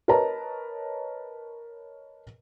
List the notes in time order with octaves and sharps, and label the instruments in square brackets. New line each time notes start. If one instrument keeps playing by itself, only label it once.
[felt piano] A#4 B4 C#5 D#5 A5 A#5